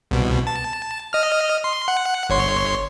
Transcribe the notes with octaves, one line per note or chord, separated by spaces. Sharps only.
C2 B2
A5
D#5 F6
C6
F#5
G1 C#5 C6